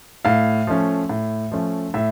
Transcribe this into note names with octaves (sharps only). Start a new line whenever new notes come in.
A2 F5
F3 A3 C#4
A2
F3 A3 C#4
A2 E5